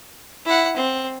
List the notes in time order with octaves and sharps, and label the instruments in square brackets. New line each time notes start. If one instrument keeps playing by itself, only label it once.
[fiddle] E4 F#5
C4